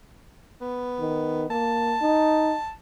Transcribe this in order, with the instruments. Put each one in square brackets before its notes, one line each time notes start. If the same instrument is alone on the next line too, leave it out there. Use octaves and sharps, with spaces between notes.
[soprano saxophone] B3
[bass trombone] D#3
[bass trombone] A#3 [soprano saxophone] A5
[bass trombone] D#4